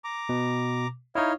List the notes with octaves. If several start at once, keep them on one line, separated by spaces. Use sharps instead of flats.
A#5 D6
B2
D#4 E4 C#5 D#5 F5